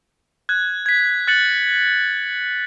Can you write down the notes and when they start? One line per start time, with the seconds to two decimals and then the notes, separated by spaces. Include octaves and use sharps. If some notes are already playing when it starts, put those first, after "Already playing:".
0.49 F#6 G#6
0.86 G#6 B6
1.27 F#6 A6 C#7 F#7